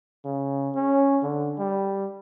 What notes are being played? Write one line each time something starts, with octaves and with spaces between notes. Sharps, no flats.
C#3
C#4
D3
G3